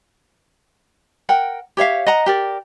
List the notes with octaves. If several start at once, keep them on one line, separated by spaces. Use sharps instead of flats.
A#4 F#5 G5
G4 C#5 E5 F5
D#5 F#5 A#5
G4 A#4 D5